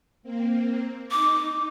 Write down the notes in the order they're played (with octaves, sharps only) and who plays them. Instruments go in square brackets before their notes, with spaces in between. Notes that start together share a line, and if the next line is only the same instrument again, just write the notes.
[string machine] A#3 C4
[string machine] D#4 [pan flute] D6